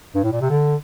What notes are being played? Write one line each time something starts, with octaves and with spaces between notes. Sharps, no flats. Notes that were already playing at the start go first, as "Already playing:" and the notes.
G2
A2
A#2
C3
D3